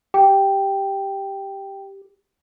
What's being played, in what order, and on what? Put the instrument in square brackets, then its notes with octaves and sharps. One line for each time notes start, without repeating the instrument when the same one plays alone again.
[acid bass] G4 [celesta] G5